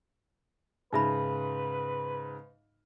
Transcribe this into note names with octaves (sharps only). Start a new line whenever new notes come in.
G#2 C#3 D#4 B4 E5 B5